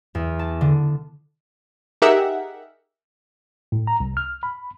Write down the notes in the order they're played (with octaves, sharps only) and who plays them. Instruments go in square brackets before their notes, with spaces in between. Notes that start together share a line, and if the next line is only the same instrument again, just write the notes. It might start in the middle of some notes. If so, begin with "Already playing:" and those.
[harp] E2
A5
D3
[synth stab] D#4 G4 G#4 A#4 E5 F#5
[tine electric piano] A2
A#5
C2
F6
B5